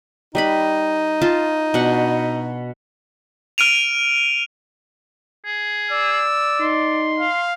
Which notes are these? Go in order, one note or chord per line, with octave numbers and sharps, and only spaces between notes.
G3 D#4 B4 B5
F4 A5
B2 D4 F#5
F6 D7 D#7 F7
G#4
D5 E6
D#4 C6
F5